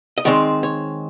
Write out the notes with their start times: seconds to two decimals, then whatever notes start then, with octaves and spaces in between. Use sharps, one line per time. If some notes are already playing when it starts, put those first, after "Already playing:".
0.18 D#5
0.25 D#3 G#3 C4 D5
0.63 C#5